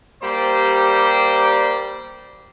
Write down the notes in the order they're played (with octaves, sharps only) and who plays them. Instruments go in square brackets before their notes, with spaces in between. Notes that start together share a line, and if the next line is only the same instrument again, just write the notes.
[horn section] G3 A#3 G4 C5 D5